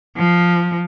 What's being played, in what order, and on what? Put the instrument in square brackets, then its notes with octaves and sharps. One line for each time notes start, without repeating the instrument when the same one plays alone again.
[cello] F3